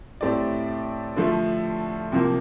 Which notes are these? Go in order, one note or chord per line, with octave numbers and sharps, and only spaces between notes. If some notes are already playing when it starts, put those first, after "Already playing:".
A2 A3 C4 G4 D5
D3 F3 A3
C3 F3 A#3